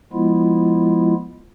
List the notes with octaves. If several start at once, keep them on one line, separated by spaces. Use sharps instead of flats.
F3 G#3 B3 E4 F4